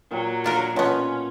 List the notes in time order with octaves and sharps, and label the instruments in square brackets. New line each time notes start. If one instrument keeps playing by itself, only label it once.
[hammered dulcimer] A#2 [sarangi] F#3
[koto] D4 F4 A#4
[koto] B2 B3 [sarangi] C#4 [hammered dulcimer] F4 [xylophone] C#5 A5 C#6